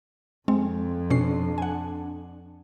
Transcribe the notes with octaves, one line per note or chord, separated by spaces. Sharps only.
F2 G#3 C4
B2 C#4 D4 C7
F#5 G#5